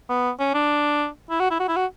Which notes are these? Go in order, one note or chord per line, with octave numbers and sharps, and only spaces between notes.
B3
C#4
D4
E4
F#4
E4
F#4
E4
F#4